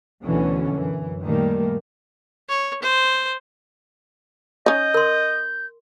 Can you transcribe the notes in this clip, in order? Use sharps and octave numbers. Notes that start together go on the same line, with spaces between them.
D2 B2 D3 E3 F#3 C#4
F#2 E3
A#2 D#3 G3 A3 A#3
C#5
C5
C#4 D#4 D#5 G6
A#4 C6